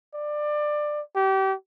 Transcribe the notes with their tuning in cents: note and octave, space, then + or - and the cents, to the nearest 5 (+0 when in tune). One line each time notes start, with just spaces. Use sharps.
D5 +20
G4 -30